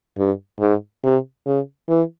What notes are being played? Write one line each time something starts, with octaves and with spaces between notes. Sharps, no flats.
G2
G#2
C3
C#3
E3